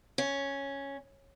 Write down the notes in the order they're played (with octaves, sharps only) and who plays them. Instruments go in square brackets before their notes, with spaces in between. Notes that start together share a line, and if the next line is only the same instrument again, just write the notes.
[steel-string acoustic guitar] C#4